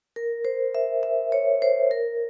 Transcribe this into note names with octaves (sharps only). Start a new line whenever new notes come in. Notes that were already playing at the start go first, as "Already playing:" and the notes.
A#4
C5
E5
E5
C#5
C5
A#4